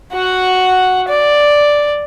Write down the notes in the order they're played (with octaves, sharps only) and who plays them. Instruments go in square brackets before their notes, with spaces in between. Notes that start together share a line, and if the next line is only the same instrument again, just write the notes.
[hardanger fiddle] F#4 F#5
D5